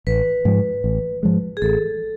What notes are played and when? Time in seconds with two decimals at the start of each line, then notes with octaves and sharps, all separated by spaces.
0.07 A1 B4
0.45 G#2 F3 G#3
0.84 A1
1.23 G#2 F3 G#3
1.57 G#4
1.62 A1 A4